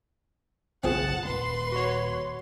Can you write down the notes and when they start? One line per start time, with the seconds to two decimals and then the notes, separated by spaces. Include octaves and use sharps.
0.84 F#1 B1 C#3 C4 F4 G#4 F#5 A5
1.25 D#1 A#3 B4 C6
1.72 F#4 C#5